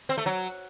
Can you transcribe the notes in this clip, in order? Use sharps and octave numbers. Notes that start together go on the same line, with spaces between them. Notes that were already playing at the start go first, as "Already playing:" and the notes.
C4
A3
F#3